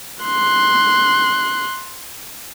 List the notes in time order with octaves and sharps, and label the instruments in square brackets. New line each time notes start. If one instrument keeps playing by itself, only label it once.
[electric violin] C6 F#6